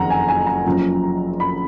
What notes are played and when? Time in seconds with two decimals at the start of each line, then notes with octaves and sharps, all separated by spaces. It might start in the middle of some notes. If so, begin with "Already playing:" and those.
Already playing: F#1 F2 D#3 F#5 A#5
0.10 G#5
0.28 G#5
0.47 A#5
0.66 F#1 F#2 F3
1.40 B5